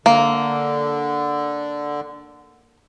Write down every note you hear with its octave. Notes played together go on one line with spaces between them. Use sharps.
D3 A#3